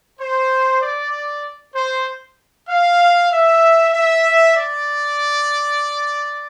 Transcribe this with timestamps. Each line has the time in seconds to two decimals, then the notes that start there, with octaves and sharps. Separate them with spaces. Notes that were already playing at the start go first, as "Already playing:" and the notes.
0.19 C5
0.81 D5
1.74 C5
2.68 F5
3.31 E5
3.93 E5
4.56 D5